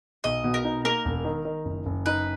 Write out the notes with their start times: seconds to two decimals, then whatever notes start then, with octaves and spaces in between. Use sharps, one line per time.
0.24 B1 D#5
0.44 B2
0.54 A#4
0.65 D#4
0.85 A#3 A#4
1.05 E1
1.25 D#3
1.45 D#3
1.65 F#1
1.86 F#1
2.06 D#4 B4